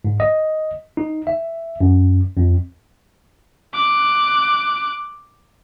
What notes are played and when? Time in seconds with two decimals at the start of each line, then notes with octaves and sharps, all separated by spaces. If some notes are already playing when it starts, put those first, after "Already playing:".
0.04 G#2
0.20 D#5
0.97 D#4
1.27 E5
1.81 F#2
2.37 F2
3.74 D6 F#6